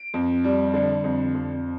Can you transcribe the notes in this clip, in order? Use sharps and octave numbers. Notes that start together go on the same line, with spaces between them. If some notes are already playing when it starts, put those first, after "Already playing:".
Already playing: D7
F2
G3
D3
F2
F2